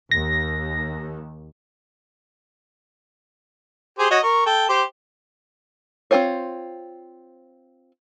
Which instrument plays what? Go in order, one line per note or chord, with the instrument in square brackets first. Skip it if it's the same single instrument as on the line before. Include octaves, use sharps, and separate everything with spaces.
[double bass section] D#2 [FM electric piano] A#6
[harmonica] G4 G#4 C5
F#4 C#5 D#5
A#4 C#6
A4 G5
G4 C5
[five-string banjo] C4 D4 F4 C5 C#5